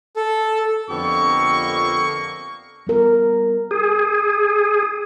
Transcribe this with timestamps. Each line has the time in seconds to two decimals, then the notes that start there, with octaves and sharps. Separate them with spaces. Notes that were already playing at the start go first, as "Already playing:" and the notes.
0.16 A4
0.89 F2 D3 A#3 B3 G4 A4 C#6
2.87 G3 B3 A#4
3.71 G#4